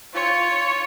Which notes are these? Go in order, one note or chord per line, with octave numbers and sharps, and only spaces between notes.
F4 C#5